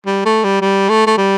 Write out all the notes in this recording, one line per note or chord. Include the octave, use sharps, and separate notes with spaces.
G3
A3
G3
G3
A3
A3
G3